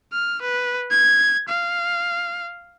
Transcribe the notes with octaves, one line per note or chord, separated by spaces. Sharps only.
F6
B4
G#6
F5